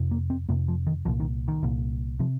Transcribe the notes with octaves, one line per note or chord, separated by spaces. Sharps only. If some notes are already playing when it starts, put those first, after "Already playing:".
Already playing: F2 C3
A#3
C4
F2 C3 A#3
F3
D#3
C2 A#2 F3
D#3
D#3
C2 A#2
C3 F3